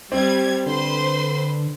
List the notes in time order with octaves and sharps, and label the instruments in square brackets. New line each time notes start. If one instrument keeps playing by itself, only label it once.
[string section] G3 G#6 [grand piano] C4
[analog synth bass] D3 [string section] B4 C5 C6